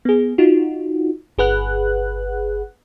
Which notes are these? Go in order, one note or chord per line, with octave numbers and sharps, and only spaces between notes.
B3 G#4
D#4 F4 F#4
G1 G#4 B4 F#5 F#6